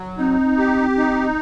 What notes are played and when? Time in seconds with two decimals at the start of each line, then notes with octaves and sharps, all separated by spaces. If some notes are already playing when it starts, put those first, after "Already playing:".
Already playing: F#3
0.18 C4 D#4
0.58 G4
0.97 D#4